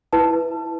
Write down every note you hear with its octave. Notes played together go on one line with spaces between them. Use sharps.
E4 B4 A5